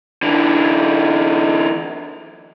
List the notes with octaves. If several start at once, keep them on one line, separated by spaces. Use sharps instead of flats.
D3 E3